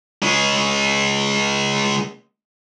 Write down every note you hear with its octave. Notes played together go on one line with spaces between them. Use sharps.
C#3 G#3